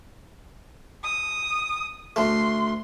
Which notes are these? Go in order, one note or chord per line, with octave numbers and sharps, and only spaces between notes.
D#6
D2 A3 C6